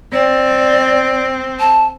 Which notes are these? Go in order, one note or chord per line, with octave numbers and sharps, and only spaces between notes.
C4 D5
A5